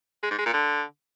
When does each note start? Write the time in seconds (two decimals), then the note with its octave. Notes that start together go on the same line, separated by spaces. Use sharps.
0.23 G#3
0.31 G#2
0.38 G#3
0.46 A#2
0.53 D3